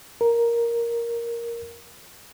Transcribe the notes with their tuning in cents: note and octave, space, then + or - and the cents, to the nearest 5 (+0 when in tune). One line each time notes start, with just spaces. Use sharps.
A#4 +5